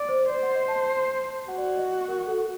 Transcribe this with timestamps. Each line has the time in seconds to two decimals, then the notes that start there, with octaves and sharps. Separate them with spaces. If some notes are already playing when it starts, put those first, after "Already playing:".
Already playing: D5
0.09 C5
0.29 C5 D5
0.43 F#5
0.55 D#5
0.68 A5
1.48 F#4 F#5
1.58 D5
1.68 D5
1.77 D#5
2.08 A#4
2.27 A4